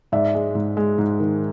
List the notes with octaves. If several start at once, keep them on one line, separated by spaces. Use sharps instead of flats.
G#2 D5 E5
G#3
G#2
G#3
G#2
D#3